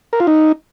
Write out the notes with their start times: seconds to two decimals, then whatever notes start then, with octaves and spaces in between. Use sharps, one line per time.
0.13 A#4
0.20 F4
0.27 D#4